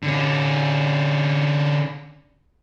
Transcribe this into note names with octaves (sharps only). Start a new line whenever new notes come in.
D3 C#4